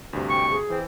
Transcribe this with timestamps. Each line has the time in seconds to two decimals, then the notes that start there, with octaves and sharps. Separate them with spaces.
0.13 D2 G2 C3
0.30 G5 C#6
0.51 G#4
0.70 E3 C4